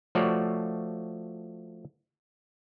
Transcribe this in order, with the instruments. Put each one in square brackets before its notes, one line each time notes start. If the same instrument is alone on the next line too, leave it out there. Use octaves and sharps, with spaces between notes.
[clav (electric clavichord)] F3 A3 F#4 C#5 D5